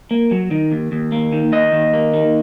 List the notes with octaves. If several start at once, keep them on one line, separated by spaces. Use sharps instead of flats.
A#3
F#3
D#3
D#2
D#2
A#3
D#3
D#2 D#5
D#2
A#3
D#3